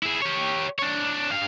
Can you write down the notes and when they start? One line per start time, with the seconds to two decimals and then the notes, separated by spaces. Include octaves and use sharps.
0.03 E4 G#4
0.22 G4 C#5
0.79 D4 C#5
1.31 G2 F5